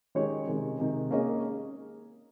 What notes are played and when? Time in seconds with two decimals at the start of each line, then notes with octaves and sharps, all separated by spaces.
0.15 D#3 G#3 C#4 G4 C#5
0.47 C3 D#3 G#3
0.79 C3 D#3 G#3
1.11 A#3 C#4 G#4 D#5